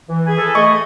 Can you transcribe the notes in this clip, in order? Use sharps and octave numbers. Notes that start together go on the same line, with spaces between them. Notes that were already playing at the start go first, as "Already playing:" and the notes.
E3
G#4 G#5 B5
A4
A3 D#5 C#6